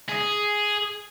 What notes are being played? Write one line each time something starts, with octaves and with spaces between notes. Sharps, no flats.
G#4